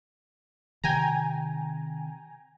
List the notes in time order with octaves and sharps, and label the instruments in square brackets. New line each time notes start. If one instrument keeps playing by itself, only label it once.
[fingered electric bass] C3 D#3 [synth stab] G5 G#5 A#5